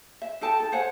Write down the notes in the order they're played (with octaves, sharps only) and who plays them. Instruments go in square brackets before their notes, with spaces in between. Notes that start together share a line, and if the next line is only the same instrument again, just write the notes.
[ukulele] E5
D#4 A4 G5 A5
A4
C5 C#5 F#5 G#5